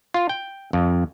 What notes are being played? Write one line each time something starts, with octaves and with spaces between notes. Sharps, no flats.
F4
G5
F2